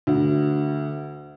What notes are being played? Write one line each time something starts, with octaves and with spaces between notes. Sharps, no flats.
D2